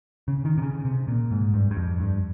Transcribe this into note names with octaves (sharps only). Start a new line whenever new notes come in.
C#3
D#3
C3
C#3
C3
A#2
G#2
G2
G2
F2
G2